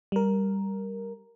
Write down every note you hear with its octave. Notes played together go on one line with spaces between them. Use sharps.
G3 A#4